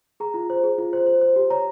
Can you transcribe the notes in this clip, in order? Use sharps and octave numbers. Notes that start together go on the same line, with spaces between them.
G#4 A#5
F4
C5
G#4
F4
C5
C5
C5
G4
C#5 A#5